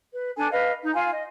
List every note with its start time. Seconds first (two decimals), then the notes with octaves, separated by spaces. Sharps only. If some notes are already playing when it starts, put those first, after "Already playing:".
0.12 B4
0.36 D4 A4 G#5
0.51 B4 D#5 F5
0.82 D#4
0.94 F4 F5 G#5
1.10 D#5